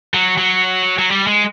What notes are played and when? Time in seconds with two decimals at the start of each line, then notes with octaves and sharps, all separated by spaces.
0.14 F#3
0.38 F#3
0.99 F#3
1.10 G3
1.27 G#3